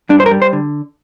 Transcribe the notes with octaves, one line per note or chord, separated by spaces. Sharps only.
G2 D4
C5
A#4
G3
C5
D3